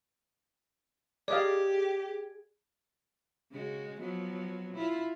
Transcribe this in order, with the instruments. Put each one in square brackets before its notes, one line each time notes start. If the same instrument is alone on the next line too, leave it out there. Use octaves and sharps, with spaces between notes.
[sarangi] G4 [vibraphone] G#4 [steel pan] D5 D#5 F5
[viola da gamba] C#3 G#3 F#4
F3 F#3 B3
E4 F4